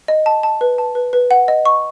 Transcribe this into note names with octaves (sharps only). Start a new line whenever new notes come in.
D#5
A5
A5
B4
A5
B4
B4
F#5
D#5
C#6